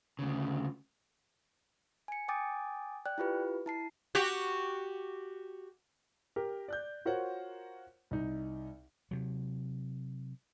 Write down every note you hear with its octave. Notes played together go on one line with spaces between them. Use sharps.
D2 C#3
G#5 C#7
G5 G#5 D6 D#6 A6
D5 G5 F#6
E4 F4 G4 B4
E4 A5 C7
F#4 G4
G4 A#4
D5 F#6 G6
F4 F#4 A#4 C5 C#5 F#5
C2 D#4
C3 F#3